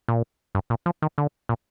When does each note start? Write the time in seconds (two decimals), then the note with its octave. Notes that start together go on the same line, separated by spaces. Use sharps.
0.08 A#2
0.55 G2
0.70 A#2
0.86 F3
1.02 D#3
1.18 D3
1.49 A#2